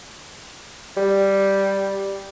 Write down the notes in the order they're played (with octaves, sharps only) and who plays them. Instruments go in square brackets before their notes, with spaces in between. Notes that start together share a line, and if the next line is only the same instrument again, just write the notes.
[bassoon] G3